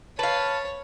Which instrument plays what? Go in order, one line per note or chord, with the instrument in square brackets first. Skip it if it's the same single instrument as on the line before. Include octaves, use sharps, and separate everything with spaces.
[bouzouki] B4 F5 [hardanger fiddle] C#5 [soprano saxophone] A5